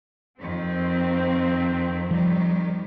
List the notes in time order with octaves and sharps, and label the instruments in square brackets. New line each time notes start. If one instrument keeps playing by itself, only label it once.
[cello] F2 D#3 [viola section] C4
[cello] D#3 G3 [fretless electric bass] F3